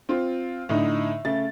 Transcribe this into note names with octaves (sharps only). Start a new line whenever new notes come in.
C4 F4
A2 D3 D#4
C#3 A3 A6